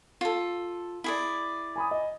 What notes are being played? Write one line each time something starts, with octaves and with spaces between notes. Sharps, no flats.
F4 A4
E4 G#4 D5
G#5 B5 D#6
D#5